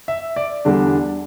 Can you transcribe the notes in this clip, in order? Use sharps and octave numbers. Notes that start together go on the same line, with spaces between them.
E5
D5
E2 D3 G3 D4